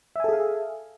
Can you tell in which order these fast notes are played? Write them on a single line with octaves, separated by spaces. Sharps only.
E5 G#5 A4 G#4 F5